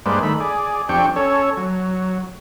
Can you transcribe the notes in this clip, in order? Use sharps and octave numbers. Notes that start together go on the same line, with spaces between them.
G2 G#3 A#3 B4 C5 D5
D#3 A3 B5
G#4 D5
F2 C4 D4 G4 G5 C#6
C#4 A4 C#5
F#3